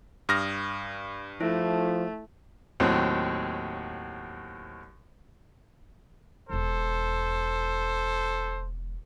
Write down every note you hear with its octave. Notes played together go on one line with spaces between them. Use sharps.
G2 D#6 F6 A#6
F3 A3 E4
D#2 A2 F#3 C4
E1 E2 A4 C5